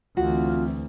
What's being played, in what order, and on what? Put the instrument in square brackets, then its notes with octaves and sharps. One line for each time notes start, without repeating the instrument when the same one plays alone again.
[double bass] D2 [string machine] E3 C4 [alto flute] F4 [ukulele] F#4